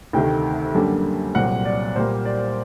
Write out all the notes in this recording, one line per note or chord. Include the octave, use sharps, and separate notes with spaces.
D2 C3 D#3 A3 G5
F#2 D3 G3 A#3
C2 A#2 F#3 C4 F#5
D5
A#2 G3 A#3 C5
D5